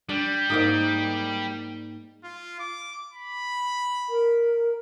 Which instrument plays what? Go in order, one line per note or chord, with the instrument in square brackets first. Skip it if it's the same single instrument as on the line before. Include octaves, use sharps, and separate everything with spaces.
[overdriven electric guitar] G3 [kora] D4
[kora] G#2 A#3 D#4
[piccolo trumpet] F4
D6
B5
[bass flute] A#4